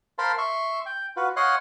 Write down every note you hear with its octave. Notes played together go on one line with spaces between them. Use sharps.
A#4 C5 F5 A5 B5 C6
E5 C6 C#6
G5
F4 F#4 B4
C#5 D#5 F5 F#5 C6 F#6